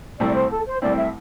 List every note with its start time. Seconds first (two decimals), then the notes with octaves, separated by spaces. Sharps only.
0.19 C2 C3 A3 C4 E4 D5
0.35 C5
0.50 A4
0.67 C5
0.81 C2 C3 A3 C4 E4 D5
0.97 E5